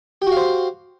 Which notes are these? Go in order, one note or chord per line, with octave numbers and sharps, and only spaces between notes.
F#4 G4 C5 F5